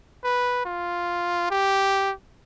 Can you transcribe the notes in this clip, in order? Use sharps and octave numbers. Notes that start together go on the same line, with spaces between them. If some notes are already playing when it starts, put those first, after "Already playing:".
B4
F4
G4